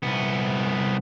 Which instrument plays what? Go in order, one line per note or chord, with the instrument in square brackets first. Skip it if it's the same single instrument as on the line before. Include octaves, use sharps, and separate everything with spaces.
[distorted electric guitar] C2 B3